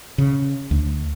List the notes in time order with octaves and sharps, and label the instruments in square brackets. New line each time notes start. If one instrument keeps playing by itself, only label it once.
[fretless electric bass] C#3
D2